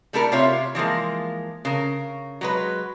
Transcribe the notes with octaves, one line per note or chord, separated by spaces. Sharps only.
G3 A3 E4 A4 A#4
C3 F4 C#5 E5
E3 F3 G#3 A#3
C#3 A#4
F#3 G#3 B4